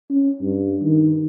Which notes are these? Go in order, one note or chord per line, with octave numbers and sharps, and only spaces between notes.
C#4
G2
D#3